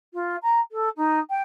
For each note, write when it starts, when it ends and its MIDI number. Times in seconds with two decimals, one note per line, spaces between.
0.14 0.37 65
0.43 0.60 82
0.72 0.89 69
0.97 1.19 63
1.30 1.43 79